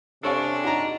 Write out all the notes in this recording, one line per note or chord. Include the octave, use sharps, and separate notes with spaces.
C3 G#3 C#4 D4 A4 C#5 F5
D#4 F#4 A#5